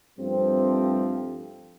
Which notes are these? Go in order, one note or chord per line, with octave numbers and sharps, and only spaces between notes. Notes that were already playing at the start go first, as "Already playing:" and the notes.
G2 F3 A3 C4